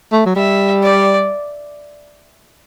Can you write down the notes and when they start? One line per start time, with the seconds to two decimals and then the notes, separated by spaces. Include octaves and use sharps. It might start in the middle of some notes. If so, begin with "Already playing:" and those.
0.12 A3
0.26 F#3
0.36 G3 E5
0.83 D5